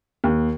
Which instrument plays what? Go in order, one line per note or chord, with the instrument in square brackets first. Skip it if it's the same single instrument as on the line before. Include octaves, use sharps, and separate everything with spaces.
[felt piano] D#2